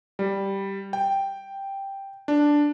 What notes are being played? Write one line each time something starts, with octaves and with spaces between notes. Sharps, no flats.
G3
G5
D4